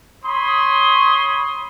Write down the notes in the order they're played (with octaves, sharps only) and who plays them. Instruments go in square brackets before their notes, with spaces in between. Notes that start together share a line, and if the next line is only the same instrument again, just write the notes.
[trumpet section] C#5 B5 C6 D#6